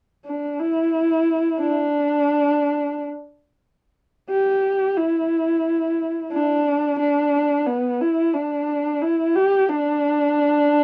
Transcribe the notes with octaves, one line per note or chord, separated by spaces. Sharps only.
D4
E4
D4
G4
E4
D4
D4
B3
E4
D4
E4
G4
D4